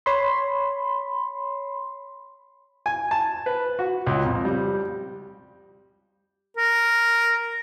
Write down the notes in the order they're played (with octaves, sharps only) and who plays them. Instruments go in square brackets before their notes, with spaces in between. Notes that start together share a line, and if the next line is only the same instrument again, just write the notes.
[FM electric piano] C#5 B5 C6
[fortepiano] G#5
A5
B4
F#4
C#2
F2
G3
[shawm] A#4